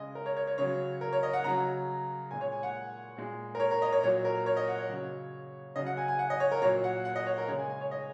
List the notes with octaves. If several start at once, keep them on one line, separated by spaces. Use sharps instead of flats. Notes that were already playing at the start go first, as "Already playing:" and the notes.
Already playing: C#3 G#3 D#5
A#4
C#5
C#5
C#5
C#3 F#3 C#5
A#4
C#5
D#5
F#5
C#3 F#3 A#5
A#2 G#3 G#5
C#5
G#5
F#5
A#2 G#3
A#4
C#5
A#4
D#5
C#5
A#2 F#3 C#5
A#4
C#5
D#5
F#5
C#5
C#3 F#3
C#3 F#3 D#5
F#5
G#5
G#5
F#5
D#5
C#5
A#4
A#2 F#3 C#5
F#5
F#5
D#5
C#5
A#4
C#3 G#3 C#5
G#5
G#5
C#5
D#5